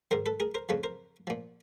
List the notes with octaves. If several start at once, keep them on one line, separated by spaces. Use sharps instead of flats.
G#2 D#3 A#4 C5
A4 B4
G#4 A#4
A#4 C5
F2 C#3 F3 B4 C#5
A#4 C5
A#2 F3